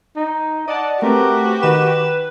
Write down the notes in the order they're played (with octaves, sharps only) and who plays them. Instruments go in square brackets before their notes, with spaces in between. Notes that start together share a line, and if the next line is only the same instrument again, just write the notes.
[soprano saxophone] D#4
[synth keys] D5 F#5 A5 [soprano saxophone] D#5
[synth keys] A3 C4 B4 [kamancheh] F#4 G4 [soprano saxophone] A#4
[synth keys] D#3 E7 [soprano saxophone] B4